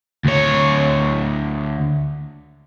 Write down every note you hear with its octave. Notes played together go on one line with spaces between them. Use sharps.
D2 C#5